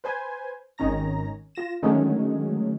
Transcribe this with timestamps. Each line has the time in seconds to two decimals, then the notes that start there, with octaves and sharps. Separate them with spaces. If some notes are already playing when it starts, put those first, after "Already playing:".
0.04 B4 C5 G#5
0.78 G#1 D#3 C#4 A#5 A#6
1.55 F4 A#6 E7
1.82 D3 D#3 F#3 G#3 A3 C#4